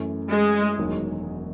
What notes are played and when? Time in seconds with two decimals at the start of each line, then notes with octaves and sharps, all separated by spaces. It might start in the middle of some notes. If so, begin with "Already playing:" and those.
Already playing: F#2 E3 A3
0.31 G#3
0.78 E1 E2 D#3 F#3